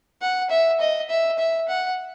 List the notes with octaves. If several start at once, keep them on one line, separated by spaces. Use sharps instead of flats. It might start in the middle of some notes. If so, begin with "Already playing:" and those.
F#5
E5
D#5
E5
E5
F#5